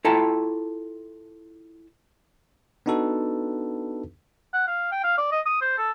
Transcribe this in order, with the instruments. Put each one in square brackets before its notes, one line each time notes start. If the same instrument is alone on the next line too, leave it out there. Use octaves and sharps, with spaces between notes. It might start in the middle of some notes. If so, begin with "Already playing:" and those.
[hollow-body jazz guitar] E4 F4 A4 G5 A5 A#5
[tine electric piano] B3 D4 D#4 F#4 A4 B4
[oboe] F#5
F5
G5
F5
D5
D#5
D#6
C5
A4